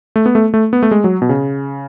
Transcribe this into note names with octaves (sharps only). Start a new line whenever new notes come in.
A3
B3
A3
A3
B3
A3
G#3
F#3
B2
C#3